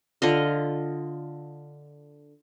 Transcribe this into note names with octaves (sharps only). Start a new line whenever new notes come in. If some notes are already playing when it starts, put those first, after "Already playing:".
D3 F4 D#5